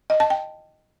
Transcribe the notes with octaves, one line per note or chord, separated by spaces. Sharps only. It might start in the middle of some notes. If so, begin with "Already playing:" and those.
D#5
A5
G5